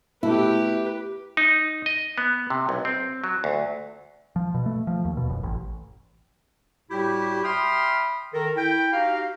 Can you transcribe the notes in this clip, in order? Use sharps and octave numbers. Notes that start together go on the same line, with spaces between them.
B2 A3 E4 G4 B4
D#4
D#5
B3
C3
B1
C4
F#3
D2
F3
B2
A3
F3
D#2
B2
F#1
A1
A2 G3 E4 F#4 G4
E5 G5 B5 C6 D#6 F6
D#3 A4 A#4
E4 G5
D#4 F#4 G4 F5